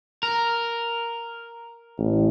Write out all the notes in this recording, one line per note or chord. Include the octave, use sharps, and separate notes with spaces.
A#4
A1